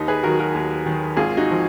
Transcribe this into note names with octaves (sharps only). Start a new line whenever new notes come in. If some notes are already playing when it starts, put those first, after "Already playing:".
Already playing: D#2 D#4
G#4 B4
D#3 F#3 F#4 A#4
F#4 A#4
D#2
D#3 F#3
G#1 F4 G#4
D#4 F#4
F3